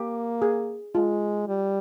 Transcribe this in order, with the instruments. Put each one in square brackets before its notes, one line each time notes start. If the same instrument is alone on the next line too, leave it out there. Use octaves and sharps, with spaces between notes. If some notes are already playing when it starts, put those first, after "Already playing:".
Already playing: [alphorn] A#3 [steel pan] G4
[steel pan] G#4
[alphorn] G#3 [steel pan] F4
[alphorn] G3